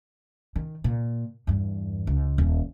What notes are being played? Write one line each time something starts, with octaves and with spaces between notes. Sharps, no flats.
D#3
A#2
E2 G2
C#2
D#1